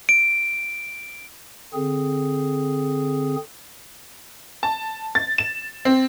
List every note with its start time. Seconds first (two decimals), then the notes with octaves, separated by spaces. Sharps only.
0.09 D7
1.74 D3 C4 G#4
4.63 A5
5.15 A6
5.38 E7
5.85 C4